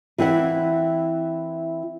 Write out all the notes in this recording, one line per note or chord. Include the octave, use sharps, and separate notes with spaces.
E3 C4 E4 F#5